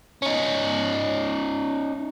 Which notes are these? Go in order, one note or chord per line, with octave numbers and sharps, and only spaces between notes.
C#4 D#4